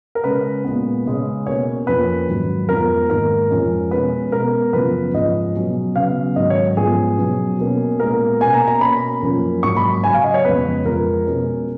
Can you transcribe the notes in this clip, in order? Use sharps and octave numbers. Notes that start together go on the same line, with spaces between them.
A#4
C#3 G#3 C#4 B4
A#2 G#3 B3
C#3 G#3 C#4
B2 A#3 C#4 C#5
F2 F3 A#3 C#4 B4
G#2 D#3 F#3
F2 F3 G#3 B3 A#4
G#2 D#3 A#3 A#4
F2 F3 G#3 C#4
B2 G#3 C#4 B4
B2 G#3 B3 A#4
F#2 C#3 F3 B3 B4
G#2 F3 G#3 C#4 D#5
B2 F#3 C#4
C#3 F#3 B3 F5
G#2 D#3 F#3 C#4 D#5
C#5
G#2 F3 B3 G#4
B2 F#3 C#4
B2 A#3 C#4
A#2 G#3 B3 A#4
B2 A#3 C#4 G#5
A#5
A#5
B2 A#3 C#4 B5
F#2 F3 A#3 C#4
G#2 F#3 A#3 C#4 C#6
B5
C#3 F#3 C#4 G#5
F5
D#5
C#5
F2 C#3 G#3 B3 B4
F2 F3 G#3 A#4
B2 G#3 C#4